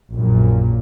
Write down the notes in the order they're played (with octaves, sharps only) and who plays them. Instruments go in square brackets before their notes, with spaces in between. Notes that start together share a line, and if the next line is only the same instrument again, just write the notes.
[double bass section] A#1 F#2 A#2